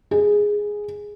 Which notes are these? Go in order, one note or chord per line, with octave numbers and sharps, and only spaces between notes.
G#4